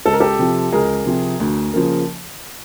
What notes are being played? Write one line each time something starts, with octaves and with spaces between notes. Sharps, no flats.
C#2 A4
A#4
G4 A4
C3 F3
C#2 G#4 A#4
C3 F3
D2
C#3 F3 A#3